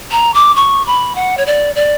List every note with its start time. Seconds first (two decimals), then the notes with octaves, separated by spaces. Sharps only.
0.12 A#5
0.34 D6
0.56 C#6
0.87 B5
1.15 F#5
1.38 C#5
1.46 D5
1.75 D5